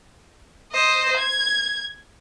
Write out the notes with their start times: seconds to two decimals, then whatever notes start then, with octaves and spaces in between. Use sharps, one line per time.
0.72 C5 D#5
1.17 G#6